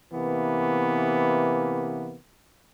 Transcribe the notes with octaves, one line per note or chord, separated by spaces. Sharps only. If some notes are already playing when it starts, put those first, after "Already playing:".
C3 E3 A#3 B3